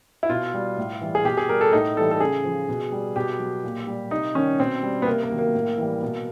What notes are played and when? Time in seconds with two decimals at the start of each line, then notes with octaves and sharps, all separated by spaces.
0.23 E4
0.29 B2 F4
0.54 G3
0.77 A2
1.01 E3 G3
1.15 G#4
1.25 B2 G4
1.37 G#4
1.49 G3 A#4
1.61 A4
1.73 A2 D#4
1.97 E3 G3 A4
2.11 A4
2.20 C#3 G#4
2.44 F3
2.69 B2
2.92 G3
3.16 B2 G4
3.40 F#3
3.64 A#2
3.87 G3
4.11 C3 D#4
4.35 D#3 G3 C#4
4.59 B2 C4
4.83 G3
5.02 B3
5.06 C3 A#3
5.23 A#3
5.31 D#3 F#3
5.39 A#3
5.55 A2
5.78 E3 G3
6.02 B2